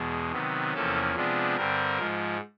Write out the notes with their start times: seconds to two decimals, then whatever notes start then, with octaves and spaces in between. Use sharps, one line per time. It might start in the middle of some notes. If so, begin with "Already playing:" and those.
Already playing: E2 B2 G#3
0.32 C3 D#3 F#3 B3
0.74 E2 C3 F3 A#3 C#4 A4
1.15 C3 F3 G#3 B3 D4
1.57 G2 D3 G3 C4 A#4
1.99 G#2 F3 G#3